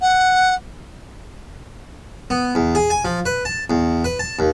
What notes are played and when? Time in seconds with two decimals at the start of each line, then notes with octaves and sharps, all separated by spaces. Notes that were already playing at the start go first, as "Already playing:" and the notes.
0.01 F#5
2.30 B3
2.55 E2
2.75 G#4
2.90 G#5
3.05 F3
3.26 B4
3.45 A5
3.70 E2
4.04 B4
4.19 A5
4.39 D#2